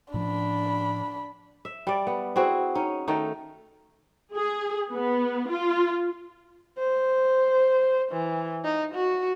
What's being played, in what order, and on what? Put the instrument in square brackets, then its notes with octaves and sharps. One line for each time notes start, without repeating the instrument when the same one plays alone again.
[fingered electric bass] A2 F3 C#4 [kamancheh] D4 B5
[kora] E5
G3 D5
B3
C4 E4 F#4 G#4
C#4 D#4
D#3 A3 D#4
[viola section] G#4
B3
F4
[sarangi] C5
E3
D#4
F#4